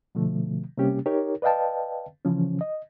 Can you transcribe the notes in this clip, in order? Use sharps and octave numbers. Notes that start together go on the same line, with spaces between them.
B2 D3 F3 A3
C3 G3 A#3 C#4 G4
D#4 G4 A#4 C#5
B4 D5 D#5 F5 G5 A5
C#3 E3 F3 C#4
D#5